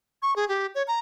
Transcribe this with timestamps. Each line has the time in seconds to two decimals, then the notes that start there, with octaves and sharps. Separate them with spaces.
0.22 C#6
0.36 G#4
0.49 G4
0.75 C#5
0.88 A#5